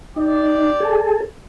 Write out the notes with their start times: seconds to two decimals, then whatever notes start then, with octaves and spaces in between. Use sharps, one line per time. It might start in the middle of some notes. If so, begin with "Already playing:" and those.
0.16 D#4 G4 D5
0.80 G#4 A4